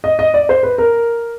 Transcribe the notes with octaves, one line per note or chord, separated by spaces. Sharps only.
D#5
D#5
D5
C5
B4
A#4